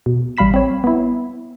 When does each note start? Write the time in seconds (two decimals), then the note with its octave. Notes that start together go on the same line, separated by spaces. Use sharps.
0.06 B2
0.37 A1 G3 F5 B5 B6 E7
0.54 C4 C#5
0.84 B3 E4